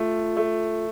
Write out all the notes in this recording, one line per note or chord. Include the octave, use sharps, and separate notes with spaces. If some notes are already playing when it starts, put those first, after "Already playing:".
Already playing: A3 F4
A3